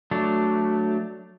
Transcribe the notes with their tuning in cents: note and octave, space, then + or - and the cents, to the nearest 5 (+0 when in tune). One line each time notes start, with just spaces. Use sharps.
F#3 +0 A3 +0 D4 +0